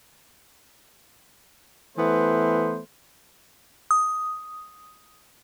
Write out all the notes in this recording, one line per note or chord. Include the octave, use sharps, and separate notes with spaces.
E3 A3 B3 C5
D#6